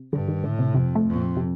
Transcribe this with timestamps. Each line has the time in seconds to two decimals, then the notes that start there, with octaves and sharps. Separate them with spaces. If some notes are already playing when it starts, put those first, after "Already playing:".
Already playing: C3
0.13 G2 D3
0.28 D#3
0.44 A2 D3
0.59 C3
0.75 F2 C3
0.95 A3
1.05 F2
1.16 A#2
1.37 C3